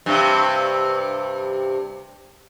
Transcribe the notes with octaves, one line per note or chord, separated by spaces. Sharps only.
G2 C3